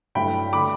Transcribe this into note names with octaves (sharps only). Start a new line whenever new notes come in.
G2 F#3 A3 E4 G5 B5
D3 A3 B5 D6